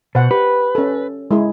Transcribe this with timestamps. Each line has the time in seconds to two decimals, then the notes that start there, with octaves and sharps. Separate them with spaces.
0.15 B2 C5 F#5
0.31 G4 B4
0.75 C#4 A4
1.31 G#3 E4 G#4